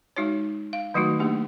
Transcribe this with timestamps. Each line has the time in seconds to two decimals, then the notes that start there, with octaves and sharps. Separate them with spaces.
0.16 G#3 D#4 F#4 C#5
0.73 F5
0.94 D#3 F#3 A3 D#4 F#4
1.20 A3 A#3 D4 G4